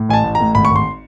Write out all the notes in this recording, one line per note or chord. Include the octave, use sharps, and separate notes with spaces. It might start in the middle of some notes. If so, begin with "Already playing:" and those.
Already playing: A2
A1 G#5 A5
A1
A2 A#5
G#1 B5
C#6
G#1 C6